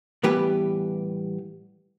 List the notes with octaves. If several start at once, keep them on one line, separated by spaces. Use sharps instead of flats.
A2 E3 G3 B3 G4 B4